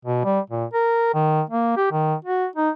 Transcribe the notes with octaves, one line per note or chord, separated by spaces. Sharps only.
B2
G3
A#2
A#4
D#3
A#3
G4
D#3
F#4
D#4